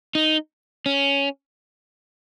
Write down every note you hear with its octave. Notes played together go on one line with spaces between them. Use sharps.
D#4
C#4